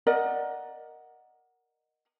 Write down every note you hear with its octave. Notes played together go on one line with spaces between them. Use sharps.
A#4 D5 D#5 F#5